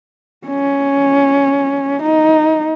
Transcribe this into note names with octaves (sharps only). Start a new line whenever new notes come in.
C#4
D#4